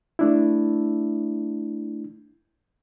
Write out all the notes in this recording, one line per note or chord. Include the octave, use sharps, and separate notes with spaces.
A3 D4 E4